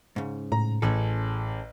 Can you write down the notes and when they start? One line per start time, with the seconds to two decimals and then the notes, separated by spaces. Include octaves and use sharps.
0.16 G#2 C#3
0.52 A2 A#5
0.82 A1 C#4 G#4 A4